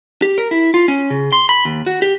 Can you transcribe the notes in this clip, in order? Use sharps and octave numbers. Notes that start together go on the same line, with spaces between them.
G4
A#4
E4
F4
C#4
C#3
C6
B5
D#2
F#4
G4